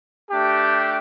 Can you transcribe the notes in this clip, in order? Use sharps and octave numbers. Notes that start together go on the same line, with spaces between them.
A3 D4 G4